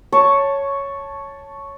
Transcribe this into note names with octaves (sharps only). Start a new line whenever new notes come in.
C#5 A5 C#6 D6